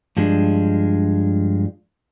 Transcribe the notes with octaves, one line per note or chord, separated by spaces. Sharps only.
G2 F3 G#3 D4